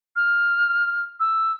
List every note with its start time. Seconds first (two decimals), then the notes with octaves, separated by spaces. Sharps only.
0.16 F6
1.20 E6